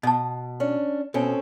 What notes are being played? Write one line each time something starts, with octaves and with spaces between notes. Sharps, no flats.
B2 D#5 A5
C#4 D4
B2 C4 C#4 A4